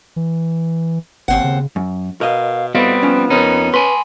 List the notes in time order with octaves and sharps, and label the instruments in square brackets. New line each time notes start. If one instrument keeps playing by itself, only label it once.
[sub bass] E3
[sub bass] G#1 [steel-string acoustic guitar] D#2 C4 F#5
[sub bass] C#3
[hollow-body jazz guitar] F#2
[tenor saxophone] B2 [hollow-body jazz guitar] A#4 D#5 [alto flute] F5
[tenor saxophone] A2 [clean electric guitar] G3 C4 [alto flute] B3 [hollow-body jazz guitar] F#4 D#5 F5
[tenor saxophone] F3 [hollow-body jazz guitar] C#4 C#5
[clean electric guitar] F2 D#4 [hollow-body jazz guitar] C4 A#4 [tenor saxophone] C#4
[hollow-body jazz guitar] B4 [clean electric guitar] G#5 B5 C6